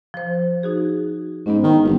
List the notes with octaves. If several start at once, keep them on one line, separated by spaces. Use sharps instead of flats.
F3 C5
D#4 F#4 G#4
G#2 B3 C#4
D#3
G1